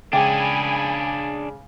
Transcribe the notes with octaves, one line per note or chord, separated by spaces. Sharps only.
C#3 G#3 D4 G#4 G5 G#5 B5 D6